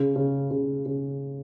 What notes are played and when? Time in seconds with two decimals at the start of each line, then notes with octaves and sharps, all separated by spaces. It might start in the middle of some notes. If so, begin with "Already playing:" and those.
Already playing: C#3
0.16 C#3
0.51 C#3
0.86 C#3